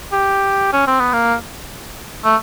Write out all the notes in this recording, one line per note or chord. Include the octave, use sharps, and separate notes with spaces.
G4
C#4
C4
B3
A#3
A3